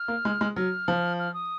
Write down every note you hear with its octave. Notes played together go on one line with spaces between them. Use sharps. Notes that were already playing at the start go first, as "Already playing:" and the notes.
Already playing: F6
A#3
G#3
G#3
F#3 F6
F3
F6
D#6